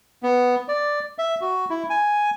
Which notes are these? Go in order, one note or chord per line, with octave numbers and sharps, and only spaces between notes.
B3
D5
E5
F#4
E4
G#5